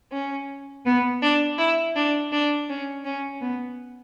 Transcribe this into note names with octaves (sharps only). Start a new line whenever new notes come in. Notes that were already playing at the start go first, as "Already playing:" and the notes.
C#4
B3
D4
E4
D4
D4
C#4
C#4
B3